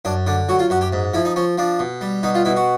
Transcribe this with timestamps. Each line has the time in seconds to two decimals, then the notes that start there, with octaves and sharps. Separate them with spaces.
0.05 F#2 D4
0.26 D3 D4
0.49 F#3 F#4
0.59 F4
0.70 F#2 F#4
0.81 G4
0.93 G#2
1.14 F3 E4
1.25 D#4
1.36 F3 C#4
1.58 F3 D4
1.79 B2
2.01 G3
2.23 B2 D#4
2.35 F4
2.45 B2 E4
2.56 F#4